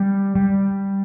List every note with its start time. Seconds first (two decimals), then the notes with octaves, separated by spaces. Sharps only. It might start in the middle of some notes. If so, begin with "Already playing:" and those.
Already playing: G3
0.35 G3